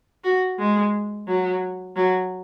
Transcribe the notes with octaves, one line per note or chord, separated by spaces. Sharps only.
F#4
G#3
F#3
F#3